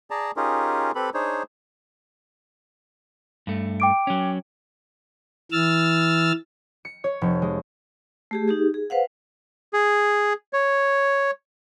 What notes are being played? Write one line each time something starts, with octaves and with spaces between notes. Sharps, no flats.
G#4 D5 A5 A#5
C#4 D#4 F4 G4 G#4 A#4
C4 G4 A4 B4 B5
D4 D#4 G#4 C5 C#5
G2 A3
G5 D6 D7
F#3 C#4
E3 E6 F6 A6
C#7
C#5
F1
G#3
A3 G4 G#4
D#4 G4 G#4
G#4
B4 C5 F5 F#5
G#4
C#5